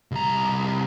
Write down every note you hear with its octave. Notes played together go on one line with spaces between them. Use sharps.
C2 A#5